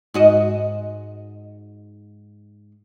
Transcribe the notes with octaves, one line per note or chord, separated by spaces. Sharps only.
G#2 F#4 D#5